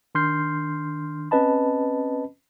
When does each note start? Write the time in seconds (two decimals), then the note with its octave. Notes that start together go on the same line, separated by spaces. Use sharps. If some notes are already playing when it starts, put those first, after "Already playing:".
0.15 D#3 D4 C6 F6 G6 C7
1.31 C4 C#4 B4 D#5 A5 B5